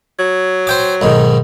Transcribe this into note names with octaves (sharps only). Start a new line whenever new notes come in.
F#3
C5 G5 D6
B1 G#2 D#3